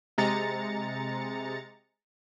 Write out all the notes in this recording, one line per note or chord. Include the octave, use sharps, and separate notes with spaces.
C3 G#3 A#5 A6 C#7